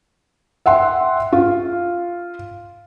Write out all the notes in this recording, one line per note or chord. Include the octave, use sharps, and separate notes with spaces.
E5 F#5 G5 C6
F4